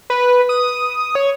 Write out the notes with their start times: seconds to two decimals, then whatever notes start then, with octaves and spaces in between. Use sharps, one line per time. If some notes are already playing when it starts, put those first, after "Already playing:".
0.10 B4
0.49 D#6
1.15 C#5